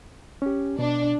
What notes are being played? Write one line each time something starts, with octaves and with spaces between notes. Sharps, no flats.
C#4 G4
B2 D4